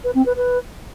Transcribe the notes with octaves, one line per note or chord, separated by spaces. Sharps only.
B4
C4
B4
B4